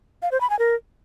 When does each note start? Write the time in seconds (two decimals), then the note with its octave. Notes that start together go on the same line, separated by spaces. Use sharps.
0.22 F5
0.32 C5
0.41 B5
0.50 G#5
0.59 A#4